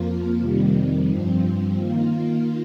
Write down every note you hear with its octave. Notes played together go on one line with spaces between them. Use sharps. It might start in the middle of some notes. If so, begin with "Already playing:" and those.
Already playing: F2 F3 A#3 F4
F2 C3 D#3 G3
G2 F3 C4
D#3 A#3 F4